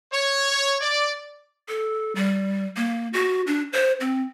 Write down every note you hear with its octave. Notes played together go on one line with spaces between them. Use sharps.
C#5
D5
A4
G3
A#3
F#4
D4
C5
C4